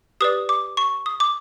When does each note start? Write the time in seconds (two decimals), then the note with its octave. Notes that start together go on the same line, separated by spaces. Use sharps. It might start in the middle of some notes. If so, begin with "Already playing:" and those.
0.20 G4 B4 D5 D#6
0.49 D6
0.77 C#6
1.06 D#6
1.20 D6